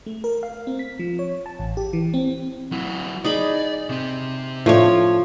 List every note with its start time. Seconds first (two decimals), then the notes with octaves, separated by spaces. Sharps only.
0.06 A3
0.24 A#4
0.43 F5
0.67 C4
0.79 B6
1.00 F3
1.19 C#5
1.46 A5
1.59 A1
1.77 G4
1.93 E3
2.14 C4
2.72 F#3 E4
3.25 D#4 G#4 D5 B5
3.89 C3 C4
4.66 A2 F3 A3 D4 C#5